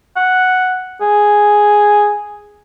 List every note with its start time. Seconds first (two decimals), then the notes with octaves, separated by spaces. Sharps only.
0.16 F#5
1.01 G#4